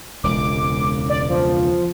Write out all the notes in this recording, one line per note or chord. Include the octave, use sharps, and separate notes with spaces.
E1 C#2 D6
D5
F3